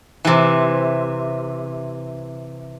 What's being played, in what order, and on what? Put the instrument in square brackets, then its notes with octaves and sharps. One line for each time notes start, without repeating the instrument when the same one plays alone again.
[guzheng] C3 E3